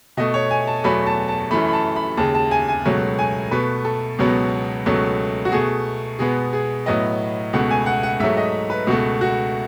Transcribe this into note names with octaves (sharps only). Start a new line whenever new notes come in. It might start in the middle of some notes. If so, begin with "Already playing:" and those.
B2 A3 D#5
C#5
G#5
A5
E2 B2 F#3 A3 B5
A5
A5
F#2 E3 A3 B5
B5
A5
B5
D#2 C#3 G#3 A5
A5
G#5
G#5
C#2 B2 F#3 A3
G#5
B2 A3 B4
A4
C#2 B2 F#3 B3
C#2 B2 F#3 A3
F#4
B2 A3 G#4
B2 G#3 B3 G#4
G#4
A2 F#3 B3 D#5
C#2 B2 A3 F#5
G#5
F#5
F#5
G#2 F#3 A3 E5
D#5
B4
C#2 B2 A3 F#4
F#4